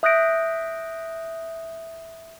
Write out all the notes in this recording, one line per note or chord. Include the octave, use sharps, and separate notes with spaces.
E5 D#6 F#6 G6 A#6 D7